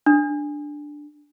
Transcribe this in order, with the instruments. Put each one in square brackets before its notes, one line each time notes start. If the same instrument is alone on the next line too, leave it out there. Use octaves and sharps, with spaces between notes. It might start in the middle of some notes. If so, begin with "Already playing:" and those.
[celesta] D4